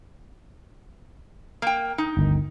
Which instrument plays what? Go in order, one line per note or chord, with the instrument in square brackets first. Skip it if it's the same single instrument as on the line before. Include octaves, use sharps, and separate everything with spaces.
[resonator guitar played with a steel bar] A#3 G5
D#4
[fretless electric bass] G1 D2 D#3